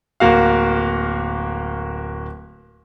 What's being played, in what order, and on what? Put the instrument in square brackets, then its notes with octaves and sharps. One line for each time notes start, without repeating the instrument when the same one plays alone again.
[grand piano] D1 A#3 F#4 F5